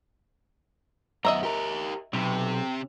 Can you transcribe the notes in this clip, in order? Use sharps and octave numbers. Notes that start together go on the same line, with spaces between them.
F#2 B3 D#5 E5 A#5
G4 A#4
B1 C3